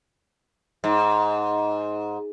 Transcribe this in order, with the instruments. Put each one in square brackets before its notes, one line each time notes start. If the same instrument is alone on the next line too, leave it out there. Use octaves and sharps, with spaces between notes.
[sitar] G#2